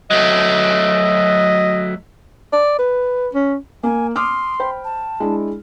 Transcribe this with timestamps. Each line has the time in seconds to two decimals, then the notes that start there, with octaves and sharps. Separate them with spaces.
0.11 F#3 A3 D#5
2.53 D5
2.78 B4
3.34 C#4
3.83 A#3 G#5
4.16 C6 D6 D#6 F6
4.60 C5 G5 B5
4.85 A5
5.20 G#3 D4 E4